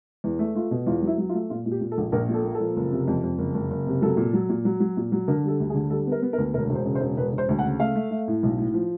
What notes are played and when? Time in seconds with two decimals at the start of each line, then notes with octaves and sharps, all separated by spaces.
0.24 E2
0.39 A3
0.55 A3 F4
0.71 B2
0.87 E2 F4
1.02 F#3 E4
1.18 F#3
1.29 F4
1.34 A3
1.50 A#2 F4
1.66 A#2
1.71 G4
1.81 A#2
1.92 A4
1.98 A#1
2.12 A#1 A#4
2.29 A#2
2.34 A4
2.44 A#3
2.55 A4
2.60 F3
2.76 F#1
2.91 C3
3.07 F2
3.24 F2
3.38 F#1
3.55 F#1
3.70 F#1
3.87 C3
4.02 F#3 A4
4.17 A#2
4.33 F#3
4.49 A#2
4.65 F#3
4.80 F#3
4.97 A#2
5.12 F#3
5.28 D3 A#4
5.44 G3 A4
5.60 D2
5.70 G#4
5.74 D3
5.90 G3 A4
6.07 B3 A#4
6.22 B3
6.33 A#4
6.38 D2
6.54 E1 A#4
6.69 E1
6.75 C5
6.85 C#3
6.95 C5
7.01 E1
7.17 E1 B4
7.32 E1
7.38 C5
7.49 D2
7.59 F#5
7.64 C#3
7.80 A3 F5
7.95 A3
8.11 A3
8.28 A2
8.43 B1
8.58 A2
8.74 F3